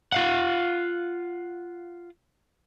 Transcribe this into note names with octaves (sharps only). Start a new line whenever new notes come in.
F4 F5 F#5